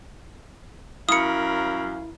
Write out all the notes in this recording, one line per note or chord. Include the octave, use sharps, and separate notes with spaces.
F#2 E4 A#4 C#5 F5 B5 D#6 C#7